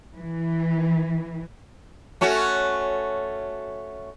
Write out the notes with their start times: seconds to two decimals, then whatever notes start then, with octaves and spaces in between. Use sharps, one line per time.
0.16 E3
2.21 A3 C#4 F#4